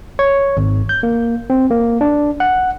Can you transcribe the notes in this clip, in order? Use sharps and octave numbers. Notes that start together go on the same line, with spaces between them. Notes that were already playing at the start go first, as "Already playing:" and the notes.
C#5
G#1
G6
A#3
C4
A#3
D4
F#5